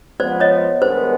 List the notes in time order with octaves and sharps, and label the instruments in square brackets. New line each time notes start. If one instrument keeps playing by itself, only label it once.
[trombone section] F3 G#3 B3 [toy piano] C5 D5
[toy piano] C#5 D#5
[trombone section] G2 D#3 G#3 B3 [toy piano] C5